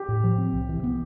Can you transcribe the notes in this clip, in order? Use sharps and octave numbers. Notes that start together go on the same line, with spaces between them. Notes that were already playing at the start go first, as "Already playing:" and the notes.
Already playing: G4
A2
F3
C4
C2
E3
B3